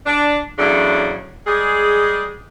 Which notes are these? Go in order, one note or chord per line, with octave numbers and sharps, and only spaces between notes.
D4
E2 A2 C#3 F#3 D4
G3 G#3 G#4